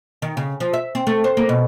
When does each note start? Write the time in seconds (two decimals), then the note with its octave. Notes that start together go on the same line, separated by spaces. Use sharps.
0.22 D#3
0.37 C#3
0.60 F3
0.73 E5
0.95 C4
1.07 A3
1.24 C5
1.37 A#3
1.49 B2